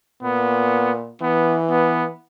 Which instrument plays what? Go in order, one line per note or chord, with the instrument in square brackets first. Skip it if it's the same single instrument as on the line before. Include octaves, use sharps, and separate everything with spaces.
[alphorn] A#2 [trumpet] B3
[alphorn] E3 [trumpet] B3
[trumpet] B3